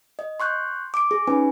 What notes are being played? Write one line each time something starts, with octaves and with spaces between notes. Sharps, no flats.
D#5
C6 C#6 F#6 G6
D6 D7
G#4
C#4 D#4 B4 G#5